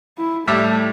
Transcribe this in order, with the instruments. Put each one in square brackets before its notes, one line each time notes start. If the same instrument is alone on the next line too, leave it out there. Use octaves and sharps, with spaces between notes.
[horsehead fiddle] E4
[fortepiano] A2 G3 E5 [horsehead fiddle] A3